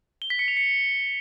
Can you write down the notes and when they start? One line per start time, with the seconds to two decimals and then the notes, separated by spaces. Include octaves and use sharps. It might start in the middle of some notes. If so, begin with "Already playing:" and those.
0.22 G7
0.30 B6
0.39 C#7
0.48 F7
0.57 C#7